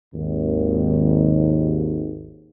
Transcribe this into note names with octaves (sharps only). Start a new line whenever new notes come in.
G#1 D#2